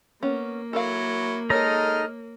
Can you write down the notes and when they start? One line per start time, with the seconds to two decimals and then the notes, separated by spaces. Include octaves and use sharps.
0.23 A#3 B3 C#4
0.73 F#3 E4 A4 A#4 F5
1.50 G#3 D#4 A4 A#4 C#5 D#5 A#5 F6